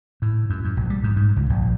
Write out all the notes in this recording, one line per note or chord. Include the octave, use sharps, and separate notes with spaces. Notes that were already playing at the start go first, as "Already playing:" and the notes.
A2
F#2
F#2
A#1
G3
G#2
G#2
C#2
A#1